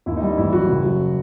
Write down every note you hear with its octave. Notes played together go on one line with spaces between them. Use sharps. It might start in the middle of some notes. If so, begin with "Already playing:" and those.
D#2 E4
D#4
G3
D#4
A1 E4
F#3 F#4
F#1
F#3